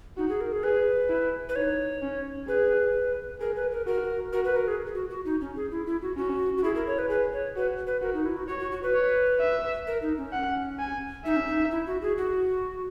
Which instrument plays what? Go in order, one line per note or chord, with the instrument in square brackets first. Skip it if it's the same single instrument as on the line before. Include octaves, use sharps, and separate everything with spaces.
[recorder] D#4 [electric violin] F#4
[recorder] G#4
A#4
G#4
[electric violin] G#4 [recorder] B4
[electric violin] E4
[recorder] B4
[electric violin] D#4 [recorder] C#5
[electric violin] C#4
[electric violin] G#4 [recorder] B4
[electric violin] G#4 [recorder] A#4
[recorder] B4
A#4
[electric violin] F#4 [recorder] A#4
[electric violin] F#4 [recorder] A#4
[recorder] B4
A#4
G#4
F#4
F#4
D#4
C#4
G#4
E4
E4
F#4
[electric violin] C#4 [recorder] F#4
[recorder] F#4
[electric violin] E4 [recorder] G#4
[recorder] A#4
C#5
B4
[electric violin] G#4 [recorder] B4
[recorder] C#5
[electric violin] F#4 [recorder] B4
[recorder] B4
[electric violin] F#4 [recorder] A#4
[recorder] D#4
E4
F#4
[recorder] F#4 [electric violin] C#5
[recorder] F#4
F#4
B4
[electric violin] C#5
E5
[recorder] A#4
D#4
C#4
[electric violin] F#5
G#5
[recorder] D#4 [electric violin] E5
[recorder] C#4
D#4
E4
F#4
G#4
F#4